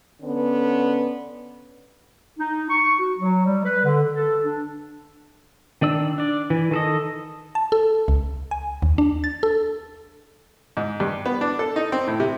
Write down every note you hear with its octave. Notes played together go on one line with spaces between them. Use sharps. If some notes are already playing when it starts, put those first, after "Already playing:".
D3 B3 C#4
D#4
C#6
F#4
F#3
G3
B4
D3
A4
D4
D#3 D4 D5 E6
D4 D5
E3
D#3 A4 D#5
A5
A4
C#2
G#5
D#2
D4
A6
A4
G#2
G2
B3
D4
A4
D#4
C4
A2
C3